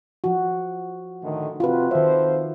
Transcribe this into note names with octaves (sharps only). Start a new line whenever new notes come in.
F3 F#4
A2 D3 D#3
C3 F4 F#4 B4
F2 D#3 F3 C5 E5